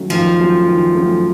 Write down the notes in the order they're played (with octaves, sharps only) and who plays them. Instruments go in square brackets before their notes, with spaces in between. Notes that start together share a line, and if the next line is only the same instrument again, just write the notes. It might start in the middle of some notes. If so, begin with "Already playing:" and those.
Already playing: [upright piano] D#3 F#3 A3 C#4
[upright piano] D#3 [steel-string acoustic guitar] F3
[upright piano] F#3 A3 C#4
D#3
F#3 A3 C#4